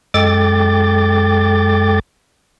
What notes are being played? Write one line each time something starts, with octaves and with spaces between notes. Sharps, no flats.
F#2 G#3 A4 G5 D6 A6